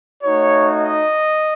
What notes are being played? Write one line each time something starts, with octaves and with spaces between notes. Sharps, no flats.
A3 D#4 F#4 C#5
D#5